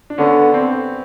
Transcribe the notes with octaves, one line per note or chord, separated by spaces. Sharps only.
D4
D3 B3 C#4
C4